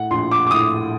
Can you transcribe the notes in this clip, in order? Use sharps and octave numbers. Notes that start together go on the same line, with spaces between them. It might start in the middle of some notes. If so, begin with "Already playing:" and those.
Already playing: A2 F#5
A#1 C6
D6
D6
A2 D#6